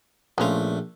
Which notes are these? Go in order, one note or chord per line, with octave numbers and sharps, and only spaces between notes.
A#1 A3 B3 C#4 F4